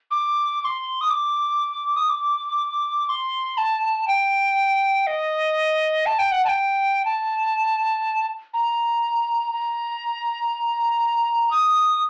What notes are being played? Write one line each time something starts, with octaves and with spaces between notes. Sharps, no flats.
D6
D6
C6
D#6
D6
D#6
D6
C6
A5
G5
D#5
A5
G5
F#5
A5
G5
A5
A#5
A#5
D#6